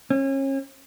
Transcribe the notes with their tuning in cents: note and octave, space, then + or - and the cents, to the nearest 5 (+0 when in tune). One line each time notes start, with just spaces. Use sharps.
C#4 -35